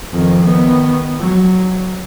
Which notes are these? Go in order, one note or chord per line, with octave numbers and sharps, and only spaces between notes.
F2 D#3
D#3 B3
F#3